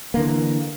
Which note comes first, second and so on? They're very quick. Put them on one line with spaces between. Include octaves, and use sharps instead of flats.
A#3 D3 E3